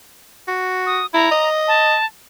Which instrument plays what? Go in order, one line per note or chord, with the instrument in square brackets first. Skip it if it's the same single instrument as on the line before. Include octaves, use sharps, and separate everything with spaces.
[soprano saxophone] F#4
[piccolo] D#6
[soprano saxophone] E4 [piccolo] A#5
[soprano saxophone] D#5
[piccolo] A5